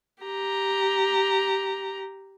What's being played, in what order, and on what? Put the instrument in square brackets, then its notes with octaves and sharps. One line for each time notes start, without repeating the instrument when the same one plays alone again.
[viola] G4 A#5